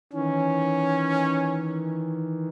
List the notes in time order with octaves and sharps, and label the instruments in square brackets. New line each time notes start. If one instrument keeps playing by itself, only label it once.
[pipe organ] D#3 E3 [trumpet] C#4